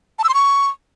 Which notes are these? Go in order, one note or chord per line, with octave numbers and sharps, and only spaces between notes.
A5
E6
C6
C#6